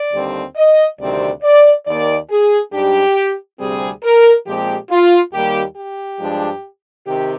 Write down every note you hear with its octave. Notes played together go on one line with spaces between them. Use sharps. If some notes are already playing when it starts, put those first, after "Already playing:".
Already playing: D5
D#2 D3 G3 C4
D#5
D2 C3 D#3 G3 C4 D5
D5
D#2 D#3 A#3 D5
G#4
G#2 G3 D4 G4
D2 C3 G3 C4 G#4
A#4
A#2 F3 G#3 C4 G4
F4
D#2 D#3 G3 A#3 G4
G4
G2 F3 G#3 D4
C3 D#3 G4